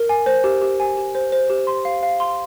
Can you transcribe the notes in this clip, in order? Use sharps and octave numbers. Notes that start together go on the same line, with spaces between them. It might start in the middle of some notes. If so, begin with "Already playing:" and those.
Already playing: A#4
G#5
C5
G4
G4
G#5
G4
C5
C5
G4
C6
F5
F5
C6